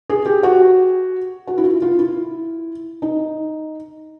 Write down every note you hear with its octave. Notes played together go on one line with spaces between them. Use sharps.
G#4
G4
F#4
F#4
E4
F4
F4
E4
D#4